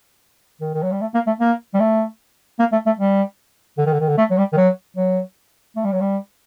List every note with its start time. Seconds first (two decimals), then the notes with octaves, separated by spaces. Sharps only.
0.61 D#3
0.74 D#3
0.83 F#3
0.92 G3
1.01 A3
1.14 A#3
1.27 A3
1.40 A#3
1.74 G3
1.80 A3
2.59 A#3
2.72 A3
2.86 A3
2.99 G3
3.78 D3
3.86 D#3
3.93 D3
4.00 D#3
4.08 D3
4.18 A3
4.30 F#3
4.38 G3
4.52 D#3
4.57 F#3
4.96 F#3
5.76 A3
5.84 G3
5.92 F#3
6.01 G3